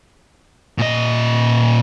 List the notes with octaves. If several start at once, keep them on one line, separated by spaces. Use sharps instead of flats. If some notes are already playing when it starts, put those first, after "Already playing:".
A#2 D#5